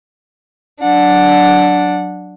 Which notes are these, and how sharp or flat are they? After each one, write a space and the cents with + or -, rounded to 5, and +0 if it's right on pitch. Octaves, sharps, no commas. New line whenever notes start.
F#3 +0 D4 +0 F#5 -10